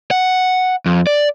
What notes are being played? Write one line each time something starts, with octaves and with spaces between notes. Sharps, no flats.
F#5
F2
D5